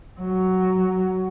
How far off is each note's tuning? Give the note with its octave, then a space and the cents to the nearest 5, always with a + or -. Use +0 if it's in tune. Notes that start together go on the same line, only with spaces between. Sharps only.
F#3 +10